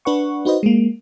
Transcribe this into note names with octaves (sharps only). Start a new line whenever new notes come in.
D4 B4 F#5 C#6
D#4 F#4 B4 C5 D#5
G#3 A#3